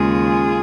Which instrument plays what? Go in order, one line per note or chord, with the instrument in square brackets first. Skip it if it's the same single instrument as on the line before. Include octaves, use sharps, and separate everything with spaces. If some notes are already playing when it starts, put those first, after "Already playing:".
Already playing: [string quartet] D#2 C#3 G#3 F4 G#4